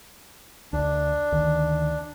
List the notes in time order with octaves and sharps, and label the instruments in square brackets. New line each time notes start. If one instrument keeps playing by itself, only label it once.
[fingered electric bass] D2 [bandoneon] D4
[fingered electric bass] D2 D#3